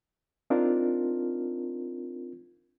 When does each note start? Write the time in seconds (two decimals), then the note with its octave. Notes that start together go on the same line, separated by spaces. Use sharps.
0.50 C4 D4 D#4 F4 A#4